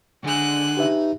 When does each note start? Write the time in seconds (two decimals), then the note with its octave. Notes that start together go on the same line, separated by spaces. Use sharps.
0.24 D3 G#3 F#6
0.77 D#4 G4 B4 E5